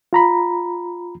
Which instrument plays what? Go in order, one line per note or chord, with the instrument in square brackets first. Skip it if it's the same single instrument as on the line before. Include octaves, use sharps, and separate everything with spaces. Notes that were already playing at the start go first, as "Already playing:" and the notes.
[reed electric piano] F4 A#5 B5